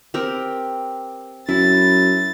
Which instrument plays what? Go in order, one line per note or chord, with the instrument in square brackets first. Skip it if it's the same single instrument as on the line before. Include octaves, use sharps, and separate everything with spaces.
[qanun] C4 G4 A#4
[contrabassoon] F#2 [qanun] E4 [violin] A6